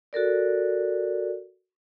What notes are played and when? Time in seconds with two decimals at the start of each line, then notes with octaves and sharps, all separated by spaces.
0.13 F#4 A4 A#4 D5